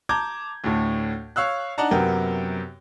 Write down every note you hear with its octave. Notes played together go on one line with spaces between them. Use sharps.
A5 A#5 D6 G6 G#6
D2 A2
C#5 F5 E6 F#6
D4 D#4 D5 F#5 A5 A#5
F#2 C3 B3 G4 A#4 G5